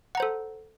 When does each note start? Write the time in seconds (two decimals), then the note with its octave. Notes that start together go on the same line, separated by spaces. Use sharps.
0.15 F#5
0.17 A#5
0.20 C5
0.23 A4